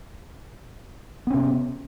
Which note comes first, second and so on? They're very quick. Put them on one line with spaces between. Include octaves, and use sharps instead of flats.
B3 C#4 C3